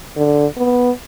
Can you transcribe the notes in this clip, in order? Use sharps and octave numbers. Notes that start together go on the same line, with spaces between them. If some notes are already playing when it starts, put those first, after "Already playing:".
D3
B3